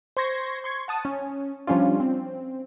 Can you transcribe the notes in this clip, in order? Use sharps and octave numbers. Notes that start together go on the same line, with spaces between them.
C5 C6 C#6 G#6 A#6
C6 C#6 G#6
F#5 A5 D#6
C#4
F3 G3 C#4 D4 F4
C4